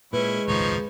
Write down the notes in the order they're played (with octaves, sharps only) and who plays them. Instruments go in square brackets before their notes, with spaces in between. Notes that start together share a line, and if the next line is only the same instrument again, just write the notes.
[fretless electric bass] A#2 [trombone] G#3 [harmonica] C#4 E4 [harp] B4
[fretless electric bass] D#1 G#1 C#2 [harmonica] F3 D#4 C#5